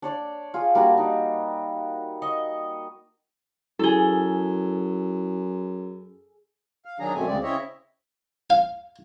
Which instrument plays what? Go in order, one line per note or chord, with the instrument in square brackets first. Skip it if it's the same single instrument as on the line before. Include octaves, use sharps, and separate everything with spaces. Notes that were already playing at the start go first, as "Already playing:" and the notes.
[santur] D4 C#5 D5
F4 G#4
G3 A#3 D4 F#4
D#4
D#5 C#6
[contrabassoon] F#2 [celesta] E4 G7 [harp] G#4 A4
[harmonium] F5
D#3 F#3 D4 G#4 A#5
F#2 B2 A3 C4 G#5
D2 C#3 G#3 C4 D5
C#3 C4 E4 C#5 D#5 E5
[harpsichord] F5